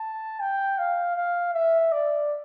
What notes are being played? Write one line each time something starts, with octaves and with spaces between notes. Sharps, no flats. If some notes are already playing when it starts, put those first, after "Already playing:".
Already playing: A5
G5
F5
F5
E5
D5